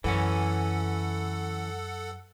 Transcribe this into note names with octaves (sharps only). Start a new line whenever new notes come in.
F#2 E3 C#4 A4 F#5